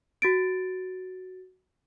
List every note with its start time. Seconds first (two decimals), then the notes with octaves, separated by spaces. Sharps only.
0.22 F#4 A6 D7